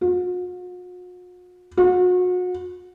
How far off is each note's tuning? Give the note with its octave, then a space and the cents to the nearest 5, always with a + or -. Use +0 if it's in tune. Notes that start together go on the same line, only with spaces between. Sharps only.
F#4 -45
F#4 -35